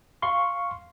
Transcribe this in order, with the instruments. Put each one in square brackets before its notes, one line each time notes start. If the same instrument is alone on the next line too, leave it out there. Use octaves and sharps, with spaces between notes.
[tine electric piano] F5 C6 C#6